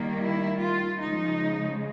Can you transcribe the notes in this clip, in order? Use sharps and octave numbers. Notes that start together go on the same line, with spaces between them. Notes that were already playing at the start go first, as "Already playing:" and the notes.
Already playing: D#3 G3 A#3
E4
F4
C#3 F3 G#3 D#4